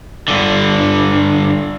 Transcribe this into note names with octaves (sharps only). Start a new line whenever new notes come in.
G2 D3